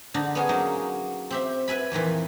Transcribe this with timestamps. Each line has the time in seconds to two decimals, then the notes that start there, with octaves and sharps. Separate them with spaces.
0.14 D3 D4 D#4
0.35 B3 C#4 G#4
0.49 F#3 A#3 D#4
1.31 C4 G4 E5
1.68 B4 E5 G#5 B5
1.92 F2 A#2 D#3 E3